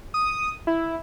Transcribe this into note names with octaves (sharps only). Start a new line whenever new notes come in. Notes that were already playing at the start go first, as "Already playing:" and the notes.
D#6
E4